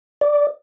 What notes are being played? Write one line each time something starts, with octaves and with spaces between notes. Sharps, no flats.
D5